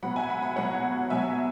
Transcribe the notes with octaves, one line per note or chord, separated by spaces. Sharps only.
B2 F#3 B3 F#5 B5
E5 G#5
F#5 B5
F#5 B5
B2 F#3 B3 C#5 F#5
B2 F#3 B3 E5 G#5